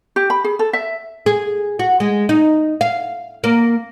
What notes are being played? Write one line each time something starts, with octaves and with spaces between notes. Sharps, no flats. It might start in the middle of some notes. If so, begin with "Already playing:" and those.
G4
B5
G#4
A4
E5
G#4
F#4
G#3
D#4
F5
A#3